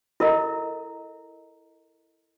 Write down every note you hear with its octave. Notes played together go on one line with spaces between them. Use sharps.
E4 A4 A#4 D#5 A#5